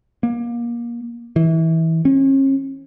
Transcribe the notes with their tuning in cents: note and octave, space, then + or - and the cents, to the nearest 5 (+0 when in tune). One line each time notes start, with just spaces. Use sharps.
A#3 +25
E3 -25
C#4 -40